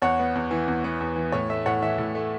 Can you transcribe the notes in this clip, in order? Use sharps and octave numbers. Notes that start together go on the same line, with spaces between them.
E2 C#5 F#5
B3
E2
E3
E2
B3
E2
E3
A2 C#5
A3 E5
A2 C#5 F#5
E3 E5
A2
A3